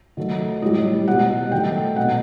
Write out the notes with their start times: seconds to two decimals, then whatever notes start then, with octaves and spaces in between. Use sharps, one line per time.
0.17 D#3 F#3 A3
0.62 A2 G3 D#5
1.07 B2 G3 F#5
1.52 D#3 F#3 A3 G5
1.96 B2 A3 F#5